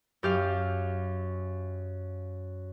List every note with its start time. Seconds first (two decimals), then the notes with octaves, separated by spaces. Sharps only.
0.23 F#2 G4 F5